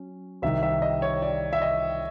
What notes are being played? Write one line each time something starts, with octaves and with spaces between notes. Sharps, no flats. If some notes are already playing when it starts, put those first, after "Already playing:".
Already playing: F#3 C#4
C2 C3 D#3 E5
E5
D#5
C#5
D5
E5
D#5